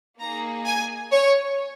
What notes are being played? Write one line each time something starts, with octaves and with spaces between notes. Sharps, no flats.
A#3 D#4 G#4 A#5
G#5
C#5